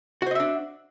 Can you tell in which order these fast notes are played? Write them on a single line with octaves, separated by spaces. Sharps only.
F#4 C5 D#5 E5 D4